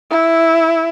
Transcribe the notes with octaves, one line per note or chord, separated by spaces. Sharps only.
E4